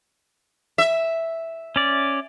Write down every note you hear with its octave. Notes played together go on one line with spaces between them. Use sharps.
E5
C#4 D5